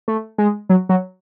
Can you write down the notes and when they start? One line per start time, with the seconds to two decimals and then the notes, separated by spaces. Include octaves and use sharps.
0.08 A3
0.38 G#3
0.70 F#3
0.89 F#3